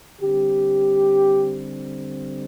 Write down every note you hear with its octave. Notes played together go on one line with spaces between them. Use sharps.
D3 G3 C4 G4